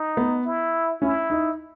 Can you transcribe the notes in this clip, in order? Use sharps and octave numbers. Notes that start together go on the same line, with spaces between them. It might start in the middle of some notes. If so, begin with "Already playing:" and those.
Already playing: D#4
B3
E4
C#4 E4
D#4